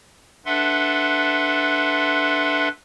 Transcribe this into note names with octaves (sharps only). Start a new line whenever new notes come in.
D4 A4 B4 E5 F#5 C6